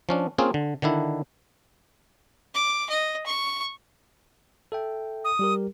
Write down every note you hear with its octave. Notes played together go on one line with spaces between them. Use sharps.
F3 C#4 D4
A#3 C4 C#4 F4 G#4
D3
D3 D#3 D4 E4
D6
D#5
C#6
A4 E5 G5
D#6
G3 G4 A#4